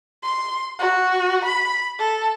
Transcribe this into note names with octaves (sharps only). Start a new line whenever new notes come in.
C6
F#4
B5
A4